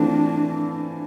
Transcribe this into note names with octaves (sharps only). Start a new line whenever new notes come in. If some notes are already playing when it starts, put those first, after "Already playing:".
Already playing: E3 A3 C4 D4 F4